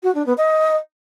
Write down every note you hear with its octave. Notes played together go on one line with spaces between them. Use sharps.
F#4
D4
B3
D#5